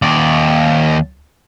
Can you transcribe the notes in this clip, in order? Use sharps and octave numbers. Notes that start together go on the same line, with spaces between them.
D#2 D5